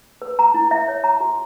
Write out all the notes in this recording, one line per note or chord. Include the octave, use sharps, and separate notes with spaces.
B4
A#5
E4
E5
C#5
A#5
F#4